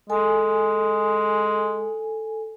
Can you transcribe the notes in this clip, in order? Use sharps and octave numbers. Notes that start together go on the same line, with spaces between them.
G#3 A4 G#5